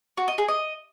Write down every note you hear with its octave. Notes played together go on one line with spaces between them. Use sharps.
F#4
D#5
G#4
D#5